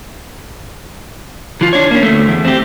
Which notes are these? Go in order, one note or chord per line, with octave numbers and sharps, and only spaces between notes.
E3 F4
D4 C#5
A#3 C#4
D2 A3
E2
C4 G4